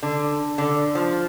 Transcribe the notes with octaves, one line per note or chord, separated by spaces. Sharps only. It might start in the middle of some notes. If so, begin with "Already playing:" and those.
D3
D3
F3